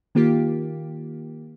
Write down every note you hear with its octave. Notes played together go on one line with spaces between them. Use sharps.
D#3 A#3 F4 G4